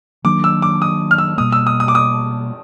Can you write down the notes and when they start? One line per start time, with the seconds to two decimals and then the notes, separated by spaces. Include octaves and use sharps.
0.24 D#3 F#3 A#3 D4 D6
0.44 E6
0.62 D6
0.82 D#6
1.11 F6
1.18 E6
1.38 B2 G3 A#3 D#6
1.52 E6
1.67 D#6
1.80 D#6
1.88 D6
1.95 D#6